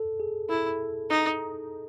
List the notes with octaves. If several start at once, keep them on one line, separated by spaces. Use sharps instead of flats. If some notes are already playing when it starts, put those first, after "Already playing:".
Already playing: A4
G#4
E4 A4
D#4